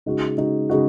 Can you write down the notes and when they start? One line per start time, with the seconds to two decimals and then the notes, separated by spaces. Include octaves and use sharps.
0.06 C#3 G#3 D#4 F#4
0.37 C#3 G#3 D#4 F#4
0.69 C#3 G#3 D#4 F#4